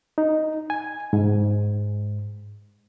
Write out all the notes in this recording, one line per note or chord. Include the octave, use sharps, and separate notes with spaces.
D#4
G#5
G#2